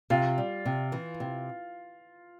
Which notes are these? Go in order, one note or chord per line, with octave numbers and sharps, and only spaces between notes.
C3 F4
G3
C3
E3
C3